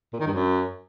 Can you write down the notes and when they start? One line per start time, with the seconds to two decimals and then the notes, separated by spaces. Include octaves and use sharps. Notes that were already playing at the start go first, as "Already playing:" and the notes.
0.13 A#2
0.20 D#3
0.27 G2
0.33 F#2